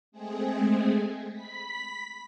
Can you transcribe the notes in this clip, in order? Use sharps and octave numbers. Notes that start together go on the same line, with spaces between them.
G#3 A3 C4 G#4
B5 B6